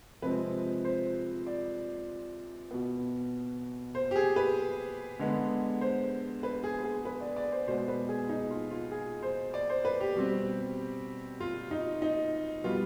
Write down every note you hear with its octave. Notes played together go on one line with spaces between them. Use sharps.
C3 F3 G#3 C4 B4
C5
D5
B2 B3
C5
G4
G#4
B4
D3 G#3 B3
C5
B4
G#4
G#4
B4
D5
D5
C5
B2 G#3 B3 C5
B4
G#4
D#4
F4
F4
G#4
C5
D5
C5
B4
G4
B2 G3 C4
F4
D#4
D#4
B2 G3 B3 F4